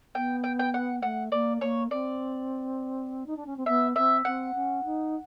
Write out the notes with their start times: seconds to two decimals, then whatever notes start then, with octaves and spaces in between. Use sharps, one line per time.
0.15 B3 G5
0.44 G5
0.59 G5
0.74 F#5
1.03 A3 F#5
1.32 A#3 D5
1.61 A#3 C#5
1.91 C4 D5
3.26 D#4
3.36 D4
3.46 C#4
3.57 C4
3.66 B3 E5
3.96 C4 E5
4.25 C4 F#5
4.54 C#4
4.84 D#4